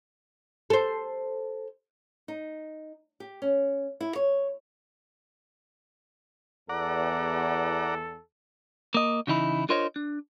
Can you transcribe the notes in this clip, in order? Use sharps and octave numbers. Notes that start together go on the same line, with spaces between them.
A4 C5
D#4
G4
C#4
E4
C#5
E2 A4 D5 F#5 A#5
A#3 D#5
C#3 E3 D#4 E4
D4 F4 A#4 C5 C#5 D#5
D4